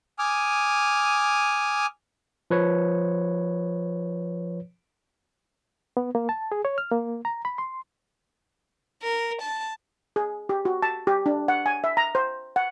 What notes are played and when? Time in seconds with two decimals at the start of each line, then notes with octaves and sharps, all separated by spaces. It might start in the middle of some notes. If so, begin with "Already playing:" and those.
0.19 G#5 D6 D#6 F6
2.51 F3 B4 C#5
5.97 B3
6.15 A#3
6.29 A5
6.52 G#4
6.65 C#5
6.78 F6
6.92 A#3
7.25 A#5
7.45 B5
7.58 C6
9.02 A#4
9.42 A5
10.16 G#4
10.49 G4
10.65 F#4
10.82 A5
11.07 G4
11.26 D4
11.48 F#5
11.66 G#5
11.84 E5
11.97 A#5
12.15 C5
12.56 F#5